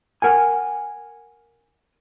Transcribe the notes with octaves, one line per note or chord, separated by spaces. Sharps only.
A#4 F#5 G#5